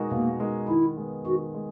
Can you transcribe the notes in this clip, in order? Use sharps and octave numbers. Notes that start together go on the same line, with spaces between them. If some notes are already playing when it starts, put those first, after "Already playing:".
Already playing: B2 G#3 D#4 F#4 A#4
B2 A#3
G#3 D#4 F#4 A#4
D#3 E4
G#3 B3
D#3 F#4
G#3